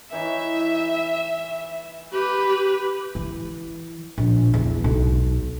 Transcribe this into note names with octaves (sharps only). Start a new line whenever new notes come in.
E3 D#4 C#5 E5
G4 B4
E3
A#1
E2
B1